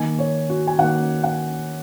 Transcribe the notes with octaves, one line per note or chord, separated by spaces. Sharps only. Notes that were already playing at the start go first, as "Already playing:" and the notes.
Already playing: D#3 A#3 G#5
C#5
F#4
G#5
D#3 A#3 F#5
F#5